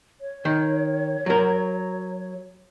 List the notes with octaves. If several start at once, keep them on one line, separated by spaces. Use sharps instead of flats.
C#5
D#3
F#3 A#4